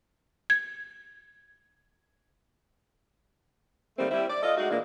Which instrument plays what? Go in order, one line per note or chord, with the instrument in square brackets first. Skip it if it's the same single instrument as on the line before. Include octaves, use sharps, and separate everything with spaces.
[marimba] G#6
[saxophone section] D#3 G3 A3 A#3 C4
G3 C4 E4
D5
F4 A4 D5 D#5
G#3 A3 D#4 F#4
A#2 E3 G#3 A#3 D4